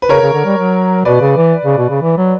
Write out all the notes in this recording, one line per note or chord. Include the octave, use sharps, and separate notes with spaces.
B4
C#3 A#4 C#5
C#3
D3
G3
F#3
B2 B4 D5
C#3
E3
C#3
B2
C#3
E3
F#3